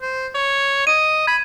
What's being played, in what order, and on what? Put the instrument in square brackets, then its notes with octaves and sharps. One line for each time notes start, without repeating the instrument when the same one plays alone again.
[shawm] C5
C#5
[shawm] D#5 [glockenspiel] D#7
[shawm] B5 [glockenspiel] G#6